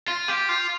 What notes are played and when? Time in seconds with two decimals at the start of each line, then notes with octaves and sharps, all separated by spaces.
0.08 F4
0.28 G4
0.49 F4